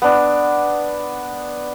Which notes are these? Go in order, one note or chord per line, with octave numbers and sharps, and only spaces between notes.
B3 D4